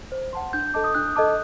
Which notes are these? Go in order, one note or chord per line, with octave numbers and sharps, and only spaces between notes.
C5
F#5 A5 C6
D4 G6
A4 D#5 A5 D6
D#6
D4 F#6
A4 D#5 A5 D6